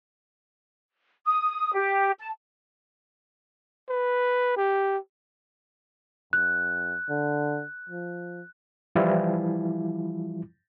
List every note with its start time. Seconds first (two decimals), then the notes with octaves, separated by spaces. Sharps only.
1.25 D#6
1.74 G4
2.20 A5
3.89 B4
4.57 G4
6.33 F2 F#6
7.09 D3
7.89 F3
8.95 E3 F3 G3 E4 F4